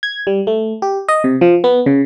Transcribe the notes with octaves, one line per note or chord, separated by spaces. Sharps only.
G#6
G3
A3
G4
D#5
C3
F3
B3
C#3